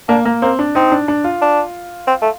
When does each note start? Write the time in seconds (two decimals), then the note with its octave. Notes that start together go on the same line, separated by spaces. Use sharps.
0.09 A#3 D4
0.25 A#3
0.42 A#3 C4
0.59 D4
0.75 C4 D#4
0.92 D4
1.08 D4
1.24 F4
1.41 D4
2.07 C4
2.22 A3